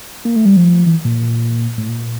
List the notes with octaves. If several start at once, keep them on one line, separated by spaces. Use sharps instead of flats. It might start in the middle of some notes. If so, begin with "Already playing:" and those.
A#3
A3
G3
F3
E3
A#2
A2
A#2